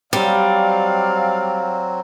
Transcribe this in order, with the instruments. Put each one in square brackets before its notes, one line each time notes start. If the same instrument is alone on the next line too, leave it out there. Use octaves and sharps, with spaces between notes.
[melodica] F#3 C4 [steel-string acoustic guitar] G3 [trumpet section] D5 F5